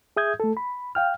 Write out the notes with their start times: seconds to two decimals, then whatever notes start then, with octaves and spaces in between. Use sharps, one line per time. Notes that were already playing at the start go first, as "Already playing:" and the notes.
0.17 G#4 E5 D#6 G6 G#6
0.40 A3 A4
0.57 B5
0.95 F5 G5 F6